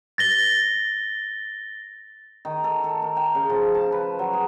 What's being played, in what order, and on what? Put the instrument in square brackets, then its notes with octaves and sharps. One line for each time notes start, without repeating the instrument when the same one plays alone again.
[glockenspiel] A6 A#6 G7
[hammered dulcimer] D#3
A4
A4
A#4
G5
C#3
F3
A5
B4
F#3
G#4